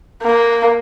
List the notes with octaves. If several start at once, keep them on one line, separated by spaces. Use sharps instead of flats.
A#3